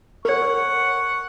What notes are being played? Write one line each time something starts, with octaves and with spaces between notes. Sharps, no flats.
A#4 C#5 F#5 C#6